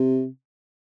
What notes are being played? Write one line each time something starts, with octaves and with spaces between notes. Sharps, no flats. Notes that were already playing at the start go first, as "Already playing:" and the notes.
Already playing: C3